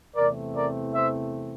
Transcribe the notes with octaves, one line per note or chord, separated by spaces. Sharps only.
E2 C3 E3 A3 C4 A#4 D5
A#4 D5
C5 E5